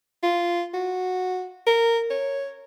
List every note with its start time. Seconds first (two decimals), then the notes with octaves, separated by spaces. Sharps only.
0.23 F4
0.74 F#4
1.67 A#4
2.11 C#5